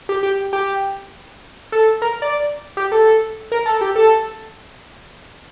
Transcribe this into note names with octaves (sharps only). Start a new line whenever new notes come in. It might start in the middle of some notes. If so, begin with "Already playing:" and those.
G4
G4
G4
A4
A#4
D5
G4
A4
A#4
A4
G4
A4